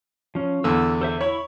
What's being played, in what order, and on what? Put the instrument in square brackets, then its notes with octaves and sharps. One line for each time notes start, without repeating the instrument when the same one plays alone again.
[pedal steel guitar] F3 C#4
[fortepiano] E2 D3 [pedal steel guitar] E6
[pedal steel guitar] A4 C5 E5
[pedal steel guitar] E4 B5 C#6 [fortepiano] C#5